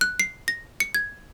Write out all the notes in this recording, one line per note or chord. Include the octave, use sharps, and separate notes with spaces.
F#6
C7
A#6
C#7
G#6